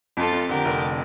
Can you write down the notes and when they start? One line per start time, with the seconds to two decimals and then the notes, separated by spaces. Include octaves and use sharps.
0.17 F2 F4 A4
0.33 F2
0.49 D3 G4 A#4
0.65 F1